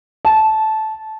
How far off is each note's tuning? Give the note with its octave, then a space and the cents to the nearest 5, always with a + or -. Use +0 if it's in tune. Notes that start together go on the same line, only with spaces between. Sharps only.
A5 -15